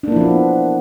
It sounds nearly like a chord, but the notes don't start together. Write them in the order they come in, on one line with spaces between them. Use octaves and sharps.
D4 A#3 E4 F3 B3